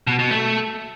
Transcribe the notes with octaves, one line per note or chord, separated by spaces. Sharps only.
B2
B2
A3